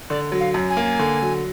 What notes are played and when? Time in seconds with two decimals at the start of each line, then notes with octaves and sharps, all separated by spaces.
0.10 D3 D5
0.32 F#3
0.40 F5
0.54 F#2
0.70 G#5
0.77 A#3
0.99 D3
1.22 F#3